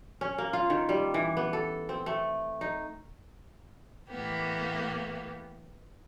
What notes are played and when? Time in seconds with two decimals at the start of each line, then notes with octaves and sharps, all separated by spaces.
0.21 C#4
0.38 A#3
0.53 F4
0.70 D#3
0.89 G3
1.14 E3
1.37 B3
1.53 A4
1.89 C4
2.06 A3
2.61 D#4
4.09 A2 E3 A#3 B3 G4